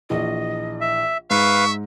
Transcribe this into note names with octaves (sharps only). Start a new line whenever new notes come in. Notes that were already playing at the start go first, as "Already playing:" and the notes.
A#1 E3 D#5
E5
G#2 B4 E5 F5 C#6